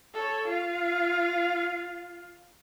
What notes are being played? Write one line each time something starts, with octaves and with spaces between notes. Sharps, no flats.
A4 C#5
F4 F5